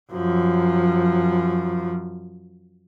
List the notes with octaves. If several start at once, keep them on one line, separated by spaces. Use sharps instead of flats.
F#2 F3